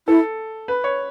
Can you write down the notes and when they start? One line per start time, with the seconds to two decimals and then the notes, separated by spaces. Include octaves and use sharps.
0.08 E4 A4
0.68 B4
0.84 C#5